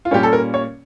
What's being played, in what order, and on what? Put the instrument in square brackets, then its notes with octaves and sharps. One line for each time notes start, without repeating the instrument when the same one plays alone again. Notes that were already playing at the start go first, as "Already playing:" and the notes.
[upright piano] F4
A#2 G3 A#3 C#4 G4
A4
A#4
C#5